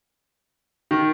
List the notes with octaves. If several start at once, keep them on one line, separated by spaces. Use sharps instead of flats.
D#3